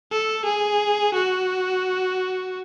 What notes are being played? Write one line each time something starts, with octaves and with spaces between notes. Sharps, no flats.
A4
G#4
F#4